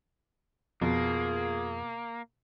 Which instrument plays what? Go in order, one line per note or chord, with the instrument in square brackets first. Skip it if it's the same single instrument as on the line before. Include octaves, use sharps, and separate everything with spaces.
[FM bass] F2 [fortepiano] B2 [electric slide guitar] A#3 [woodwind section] F4 G#4